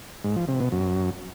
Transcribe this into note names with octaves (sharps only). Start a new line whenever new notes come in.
G#2
F3
C3
B2
F#2